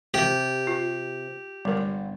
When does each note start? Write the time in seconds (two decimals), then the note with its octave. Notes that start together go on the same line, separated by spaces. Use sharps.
0.14 C3 G4
0.67 F4
1.65 G1 G3 A#4